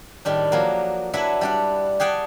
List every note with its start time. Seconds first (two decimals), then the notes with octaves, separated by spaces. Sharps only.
0.25 A2 D#3 G3 D4
0.52 F3 F#3 A#3
1.13 F#3 D4 E4 B4 E5 F#5
1.41 G3 D4 F#5
2.00 G4 G#4 F#5 G5 A5